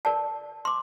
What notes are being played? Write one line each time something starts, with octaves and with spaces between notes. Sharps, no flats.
A#4 D5 A5
C6 D6